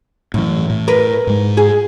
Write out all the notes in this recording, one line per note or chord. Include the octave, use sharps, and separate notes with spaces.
F#2 A2 E3
A2
A#4 B4
G#2 G#3
G#4